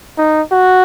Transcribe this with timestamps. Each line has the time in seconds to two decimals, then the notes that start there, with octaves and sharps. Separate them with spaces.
0.18 D#4
0.52 F#4